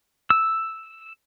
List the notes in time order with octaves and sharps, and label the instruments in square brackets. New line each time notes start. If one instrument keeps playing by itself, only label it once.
[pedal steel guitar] E6